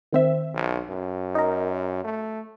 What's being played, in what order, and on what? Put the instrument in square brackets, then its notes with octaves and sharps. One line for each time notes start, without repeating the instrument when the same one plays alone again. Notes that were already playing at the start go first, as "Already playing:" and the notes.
[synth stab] D#3 C4 E5
[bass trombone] B1
F#2
[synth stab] D#4 A#4
[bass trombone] A3